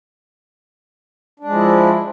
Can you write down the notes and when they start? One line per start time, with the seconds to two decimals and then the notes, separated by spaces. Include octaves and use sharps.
1.40 D4
1.45 G#3
1.49 F3
1.54 E4